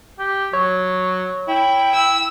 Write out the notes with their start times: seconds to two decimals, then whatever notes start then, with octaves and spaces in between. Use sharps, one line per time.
0.19 G4
0.53 F#3 C#5
1.48 E4 G5
1.93 E6